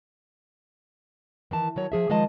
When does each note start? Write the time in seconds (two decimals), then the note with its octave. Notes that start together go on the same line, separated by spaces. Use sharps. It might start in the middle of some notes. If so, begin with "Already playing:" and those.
1.51 D#3 E3 A5
1.76 D#3 F#3 C#5
1.92 F3 G#4 E5
2.10 D#3 F3 G#3 D#5 A5